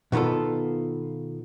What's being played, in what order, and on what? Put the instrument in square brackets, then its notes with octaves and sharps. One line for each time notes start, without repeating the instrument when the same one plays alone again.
[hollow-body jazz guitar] B2 D#3 B3 F4 A4